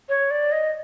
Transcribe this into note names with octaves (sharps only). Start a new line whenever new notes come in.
C#5
D5
D#5